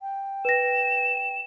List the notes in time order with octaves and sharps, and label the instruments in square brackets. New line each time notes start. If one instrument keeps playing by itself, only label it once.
[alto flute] G5
[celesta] B4 A#6 [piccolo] E7